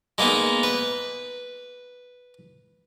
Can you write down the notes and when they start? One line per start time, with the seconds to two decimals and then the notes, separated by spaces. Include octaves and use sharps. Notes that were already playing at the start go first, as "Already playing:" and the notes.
0.18 G#3 A#3 B3 D#4
0.63 B4